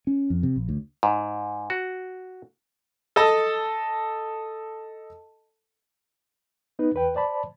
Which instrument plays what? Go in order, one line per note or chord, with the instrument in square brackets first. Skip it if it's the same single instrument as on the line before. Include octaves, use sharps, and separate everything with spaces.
[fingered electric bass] C#4
F2
C3
A#1
D2
[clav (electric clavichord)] G#2
F#4
[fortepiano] A4 D#5 A5
[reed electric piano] B3 D#4 B4
E2 B4 G5
C5 D5 A5 B5